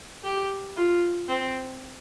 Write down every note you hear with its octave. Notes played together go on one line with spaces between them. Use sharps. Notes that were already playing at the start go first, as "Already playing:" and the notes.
G4
F4
C4